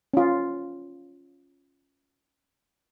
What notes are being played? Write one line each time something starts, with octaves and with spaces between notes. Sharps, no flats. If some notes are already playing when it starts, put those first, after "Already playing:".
C#4 F4